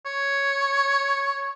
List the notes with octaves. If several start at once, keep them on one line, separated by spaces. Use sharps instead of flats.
C#5